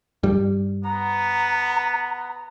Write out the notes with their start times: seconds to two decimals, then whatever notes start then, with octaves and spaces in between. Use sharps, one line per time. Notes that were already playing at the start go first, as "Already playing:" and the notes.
0.23 G2 G3
0.84 B3 A#5